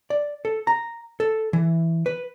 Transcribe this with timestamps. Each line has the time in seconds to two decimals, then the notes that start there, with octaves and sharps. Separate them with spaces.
0.10 D5
0.45 A4
0.67 A#5
1.20 A4
1.53 E3
2.06 B4